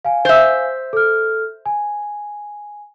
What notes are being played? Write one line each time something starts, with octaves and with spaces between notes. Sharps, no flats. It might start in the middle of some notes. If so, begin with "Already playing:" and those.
F5 G#5
C5 E5
A4 F6
G#5